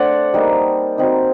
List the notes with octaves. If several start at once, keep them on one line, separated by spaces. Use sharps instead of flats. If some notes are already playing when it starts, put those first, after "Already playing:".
Already playing: A3 C4 D4 C5 D5 F#5
G3 A#3 D#4
F#3 C4 D#4